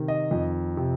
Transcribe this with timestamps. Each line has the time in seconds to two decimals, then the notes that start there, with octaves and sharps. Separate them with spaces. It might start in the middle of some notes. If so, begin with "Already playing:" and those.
Already playing: C3 D#3
0.08 D#5
0.31 F2
0.77 C3